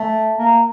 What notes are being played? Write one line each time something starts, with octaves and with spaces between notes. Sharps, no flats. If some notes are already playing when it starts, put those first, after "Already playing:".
Already playing: A3
A#3